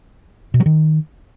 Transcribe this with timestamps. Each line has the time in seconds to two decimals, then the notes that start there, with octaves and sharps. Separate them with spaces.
0.54 B2
0.60 F#3
0.66 D#3